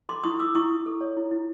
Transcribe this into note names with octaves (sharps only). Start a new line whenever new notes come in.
A4 C6 D6
E4 C#6 D#6
E4 D6 E6
E4 C#6 D#6
E4
A4
C#5
E4
E4